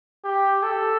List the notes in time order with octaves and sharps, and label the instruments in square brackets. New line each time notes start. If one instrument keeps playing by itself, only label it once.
[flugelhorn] G4
A4